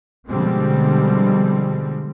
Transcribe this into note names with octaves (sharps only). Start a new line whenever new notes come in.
B2 D3 F3 G3 G#3 C4